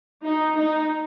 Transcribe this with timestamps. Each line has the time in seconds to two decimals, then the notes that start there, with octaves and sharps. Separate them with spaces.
0.25 D#4
0.57 D#4